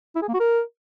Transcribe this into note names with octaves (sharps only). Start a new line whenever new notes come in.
E4
G#4
A#3
F#4
A#4